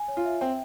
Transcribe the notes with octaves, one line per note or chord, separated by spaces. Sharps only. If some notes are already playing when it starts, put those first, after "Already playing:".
Already playing: G#5
C#5
F4
E5
C4 G5